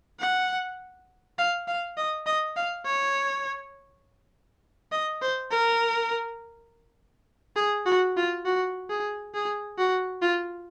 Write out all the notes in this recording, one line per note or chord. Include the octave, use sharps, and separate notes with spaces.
F#5
F5
F5
D#5
D#5
F5
C#5
D#5
C5
A#4
G#4
F#4
F4
F#4
G#4
G#4
F#4
F4